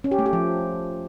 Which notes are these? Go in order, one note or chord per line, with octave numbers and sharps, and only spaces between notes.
C#4
G4
A3
G4
F3